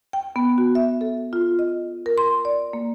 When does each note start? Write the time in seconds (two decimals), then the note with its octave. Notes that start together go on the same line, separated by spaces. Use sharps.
0.13 G5
0.36 B3
0.58 F#4
0.75 E5
1.01 A4
1.33 F4
1.59 D#5
2.06 A#4
2.18 C6
2.45 D5
2.73 A#3